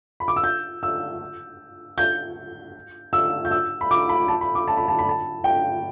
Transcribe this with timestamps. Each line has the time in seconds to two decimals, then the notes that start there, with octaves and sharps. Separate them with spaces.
0.20 B5
0.28 D6
0.36 E6
0.44 G6
0.83 E6
1.98 G6
3.13 E6
3.45 G6
3.51 E6
3.81 B5
3.91 D6
4.09 B5
4.28 A5
4.41 B5
4.55 D6
4.68 A5
4.77 B5
4.88 A5
4.99 B5
5.09 A5
5.44 G5